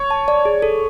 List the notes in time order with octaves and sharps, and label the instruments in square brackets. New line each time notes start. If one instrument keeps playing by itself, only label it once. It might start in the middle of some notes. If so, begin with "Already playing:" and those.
Already playing: [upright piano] C#5
[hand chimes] A5
D5
G#4
A4